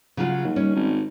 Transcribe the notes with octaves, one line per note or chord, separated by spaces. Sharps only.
C#3 F#3 F4
D#2
G3 C#4
G#1